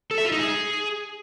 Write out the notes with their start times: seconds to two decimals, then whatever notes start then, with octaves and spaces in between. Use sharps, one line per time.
0.11 A4
0.18 E5
0.25 F4
0.32 D#4
0.39 G#4